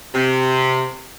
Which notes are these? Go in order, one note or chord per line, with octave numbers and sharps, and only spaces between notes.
C3